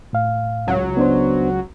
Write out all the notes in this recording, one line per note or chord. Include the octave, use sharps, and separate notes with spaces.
A2 F5
C#2 F#3
B3 D4 C5